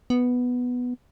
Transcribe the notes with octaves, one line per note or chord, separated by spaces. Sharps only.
B3